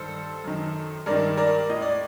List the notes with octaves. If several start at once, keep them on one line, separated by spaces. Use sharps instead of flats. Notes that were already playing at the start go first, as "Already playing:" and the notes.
Already playing: G2 D#3 A4 C5
F#2 D#3
G2 D#3 A#4 D5
A#4 D5
A2 D#5
D5